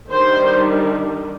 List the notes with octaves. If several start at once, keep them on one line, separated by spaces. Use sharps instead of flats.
D#3 G3 D4 C5